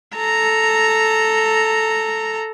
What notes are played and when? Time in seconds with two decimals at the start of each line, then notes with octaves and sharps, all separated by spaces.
0.16 A4 A#5